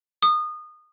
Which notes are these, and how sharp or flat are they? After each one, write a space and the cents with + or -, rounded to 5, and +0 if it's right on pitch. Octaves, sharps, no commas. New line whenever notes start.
D#6 -25